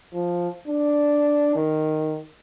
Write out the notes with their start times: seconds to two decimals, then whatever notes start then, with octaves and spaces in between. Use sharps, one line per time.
0.14 F3
0.68 D4
1.55 D#3